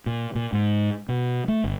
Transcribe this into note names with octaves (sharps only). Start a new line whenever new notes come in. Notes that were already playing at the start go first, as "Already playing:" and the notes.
A#2
A#2
G#2
B2
A3
G1